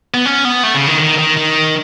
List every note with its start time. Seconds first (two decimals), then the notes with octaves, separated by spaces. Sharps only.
0.14 B3
0.26 C#4
0.45 B3
0.63 A3
0.75 C#3
0.87 D#3
1.00 D#3
1.18 D#3
1.37 D#3